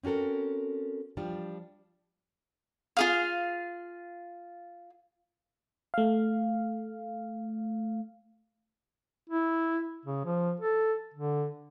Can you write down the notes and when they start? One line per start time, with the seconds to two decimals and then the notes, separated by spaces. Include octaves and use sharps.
0.03 C4 C#4 F#4 A4 A#4
1.17 F3 G3 D4
2.97 F4 G#4 F5
5.94 A3 F5
9.30 E4
10.05 C#3
10.25 F3
10.60 A4
11.14 D3